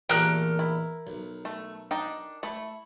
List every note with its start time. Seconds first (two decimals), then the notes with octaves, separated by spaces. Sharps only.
0.09 E2 A#2 A3 G4 A#4 G5 F6 F#6
0.59 E4
1.07 B1
1.45 A3
1.91 D4 D#4 G5
2.43 A3 E4